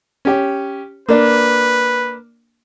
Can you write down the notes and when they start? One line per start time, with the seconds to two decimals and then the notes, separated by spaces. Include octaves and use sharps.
0.25 C#4 G4
1.09 A#3 D4 B4